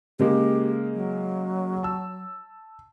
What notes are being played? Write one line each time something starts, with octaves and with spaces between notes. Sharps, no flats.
C#3 G#3 A#3 G4
F#3
A5 E6